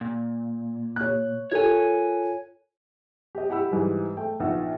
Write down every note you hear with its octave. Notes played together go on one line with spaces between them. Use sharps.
A#2
C#5 F#6
F4 A4 A#4 C#5 G#5
G4 D#5
E4 G4 F#5 B5 E6
G#2 E3 G3
A3 G5
A#1 B3 D#4 F4 F#5 E6